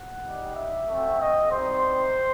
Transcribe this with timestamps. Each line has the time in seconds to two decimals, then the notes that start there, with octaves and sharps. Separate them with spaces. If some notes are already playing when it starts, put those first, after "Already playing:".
Already playing: F#5
0.24 G3 D#4 G4
0.56 E5
0.89 A3 C4 F#4
1.21 D#5
1.53 G3 C4 D#4 C5